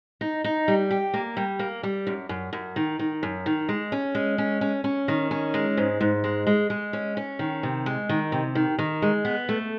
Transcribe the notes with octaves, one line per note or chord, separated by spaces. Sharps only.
D#4
D#4
G3
G4
A#3
G3
A#3
G3
F#2
F#2
F#2
D#3
D#3
F#2
D#3
G#3
C#4
G#3
C#4
C#4
C#4
D#3
C#4
G#3
G#2
G#2
G#3
G#3
G#3
C#4
C#4
D#3
C3
G#3
D#3
C3
D#3
D#3
G#3
B3
A3